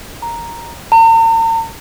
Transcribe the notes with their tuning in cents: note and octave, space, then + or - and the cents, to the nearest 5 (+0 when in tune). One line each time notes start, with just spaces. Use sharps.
A#5 +0
A#5 -45